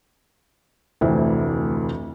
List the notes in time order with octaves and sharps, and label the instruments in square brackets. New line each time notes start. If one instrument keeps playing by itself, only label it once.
[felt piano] F1 D2 E3 E4 C5